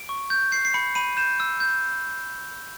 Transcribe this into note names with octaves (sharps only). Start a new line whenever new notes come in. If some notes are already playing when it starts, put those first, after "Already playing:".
Already playing: D7
C#6
G6
G6 C7
C7
B5 C#7
B5 D#7
G6 E7
E6
G6